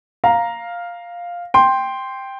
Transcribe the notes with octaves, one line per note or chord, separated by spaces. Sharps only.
F5 A#5
G5 C6